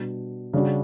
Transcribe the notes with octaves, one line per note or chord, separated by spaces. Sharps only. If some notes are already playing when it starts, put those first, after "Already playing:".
Already playing: B2 G3 D4
C#3 G3 D4 F#4